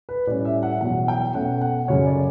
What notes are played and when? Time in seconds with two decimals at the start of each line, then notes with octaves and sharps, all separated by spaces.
0.09 B4
0.27 A2 G3 C#4 D5
0.45 E5
0.63 F#5
0.81 E2 B2 F#3 F#5
1.08 G5
1.34 B2 A3 C#4 F#5
1.61 F#5
1.88 F#2 C#3 F#3 A3 C#5
2.06 D5